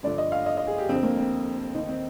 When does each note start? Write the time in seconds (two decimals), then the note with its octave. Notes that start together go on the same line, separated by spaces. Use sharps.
0.03 G1 G2 D3 F3 D5
0.18 D#5
0.32 F5
0.46 D#5
0.57 D#5
0.67 G#4
0.78 G4
0.89 F1 F2 D3 C4
1.03 A#3
1.17 C4
1.74 D#2 D#3 D#4
1.89 C4